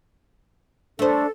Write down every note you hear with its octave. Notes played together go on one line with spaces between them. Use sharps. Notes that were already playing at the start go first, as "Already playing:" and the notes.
A3 D4 A4 C5